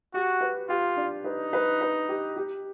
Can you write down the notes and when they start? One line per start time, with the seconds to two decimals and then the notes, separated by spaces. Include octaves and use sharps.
0.14 F#4 G4
0.41 B4
0.69 F4 G4
0.97 D4
1.24 D#4 B4
1.53 B4
1.81 B4
2.09 G4
2.37 G4